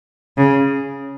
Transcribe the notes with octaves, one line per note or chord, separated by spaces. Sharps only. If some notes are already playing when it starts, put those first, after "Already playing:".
C#3